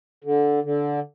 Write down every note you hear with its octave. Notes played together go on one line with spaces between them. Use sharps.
D3
D3